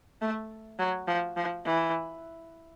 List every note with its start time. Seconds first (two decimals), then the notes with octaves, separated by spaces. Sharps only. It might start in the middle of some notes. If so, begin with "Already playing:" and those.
0.21 A3
0.79 F#3
1.07 F3
1.37 F3
1.65 E3